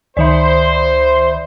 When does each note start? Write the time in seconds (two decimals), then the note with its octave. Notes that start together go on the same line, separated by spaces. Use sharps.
0.17 C#2 D#3 C5 D5 E5 B5